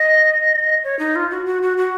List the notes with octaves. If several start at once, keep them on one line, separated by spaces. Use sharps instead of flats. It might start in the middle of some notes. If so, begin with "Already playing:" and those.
Already playing: D#5
C#5
D#4
F4
F#4
F#4
F#4
F#4